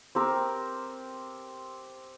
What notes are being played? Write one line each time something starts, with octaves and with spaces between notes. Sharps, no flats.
C4 G4 A#4